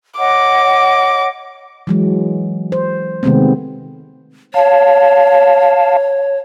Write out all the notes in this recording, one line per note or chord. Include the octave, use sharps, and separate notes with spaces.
C#5 D#5 F#5 D6
E3 F#3 G#3
C5
C3 D#3 G#3 A3 B3 C4
C#5 F5 A5